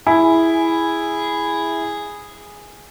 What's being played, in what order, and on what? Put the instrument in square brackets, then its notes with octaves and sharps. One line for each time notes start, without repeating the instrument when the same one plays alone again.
[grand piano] E4 [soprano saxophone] G#4 [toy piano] G#5